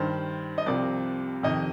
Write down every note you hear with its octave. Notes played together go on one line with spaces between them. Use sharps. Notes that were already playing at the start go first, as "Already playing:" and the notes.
Already playing: G2 D#3 C5
D#5
C2 C3 F3 D5
F2 C3 D#3 D#5